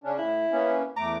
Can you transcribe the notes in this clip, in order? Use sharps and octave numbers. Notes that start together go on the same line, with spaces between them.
C#3 C#4 D4
A2 E4
A#3 B3 C#4
E2 A3 A#5 D6